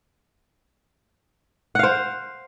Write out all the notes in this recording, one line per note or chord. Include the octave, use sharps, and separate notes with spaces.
C5 F5 F#5